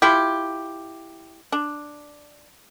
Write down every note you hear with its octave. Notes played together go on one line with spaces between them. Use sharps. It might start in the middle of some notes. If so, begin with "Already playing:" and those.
E4 F4 G4
D4